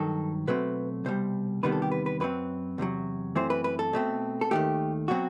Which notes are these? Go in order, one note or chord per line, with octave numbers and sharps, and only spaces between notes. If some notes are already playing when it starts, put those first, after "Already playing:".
Already playing: G2 D#3 F#3 A4
B2 F#3 A3 C4 B4
C2 B2 G3 C5
E2 C3 D#3 G3 B3 B4
A4
G4
B4
B4
F#2 F#3 C4 B4
E2 C3 D#3 F#3
F#2 E3 A3 C4 C5
B4
B4
A4
B2 A3 C4
A4
D#2 D#3 A3 G4
B2 F#3 C4 F#4